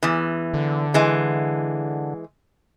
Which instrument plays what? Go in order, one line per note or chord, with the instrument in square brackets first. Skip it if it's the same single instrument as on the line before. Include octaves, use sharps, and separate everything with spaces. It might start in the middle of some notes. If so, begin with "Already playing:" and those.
[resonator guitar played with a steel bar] E2 E3
[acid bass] D3
[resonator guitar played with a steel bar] E3 G#3